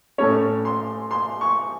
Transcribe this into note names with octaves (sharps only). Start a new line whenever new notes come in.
A2 A3 C#4 C#5
C6
C6
C#6